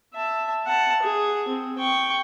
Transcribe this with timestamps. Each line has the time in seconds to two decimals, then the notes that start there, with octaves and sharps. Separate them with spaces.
0.14 E5 A5
0.66 F#5 A5
1.02 G#4
1.48 C4
1.79 G5 C#6